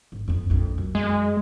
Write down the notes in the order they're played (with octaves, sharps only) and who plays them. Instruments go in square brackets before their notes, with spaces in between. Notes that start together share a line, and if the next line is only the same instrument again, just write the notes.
[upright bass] G#1
F2 B3
A#1 F2
F#2
[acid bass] G#3